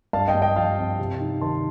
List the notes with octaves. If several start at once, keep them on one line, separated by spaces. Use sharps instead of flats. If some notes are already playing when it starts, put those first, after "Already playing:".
G2 F5 A5
D#5 G5
G2
D#5 G5
F3 F5 A5
C4
C3
D#4
D#3 A5 C6